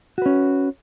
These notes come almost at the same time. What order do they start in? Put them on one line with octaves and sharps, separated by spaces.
F#4 B4 C#4